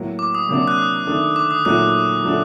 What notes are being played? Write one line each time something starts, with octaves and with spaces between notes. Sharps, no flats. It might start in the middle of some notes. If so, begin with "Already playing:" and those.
Already playing: A2 F#3 A#3
D6
D#6
C3 F#3 A#3 D4
F#6
D#6
D#3 A3 D4
D6
D#6
A#2 F#3 A3 D#4 F#6
A#2 F#3 A3 D4